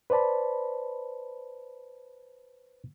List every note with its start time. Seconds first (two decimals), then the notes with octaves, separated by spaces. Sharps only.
0.10 B4 C5 D5 A5 B5